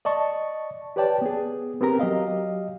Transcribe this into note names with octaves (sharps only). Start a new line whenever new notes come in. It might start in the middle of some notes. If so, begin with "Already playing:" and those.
D5 D#5 A5 C#6
G4 B4 C#5 D5 G5 A5
B3 G#4
B3 C4 G4 A#4 A#5
F#3 G4 D#5 F5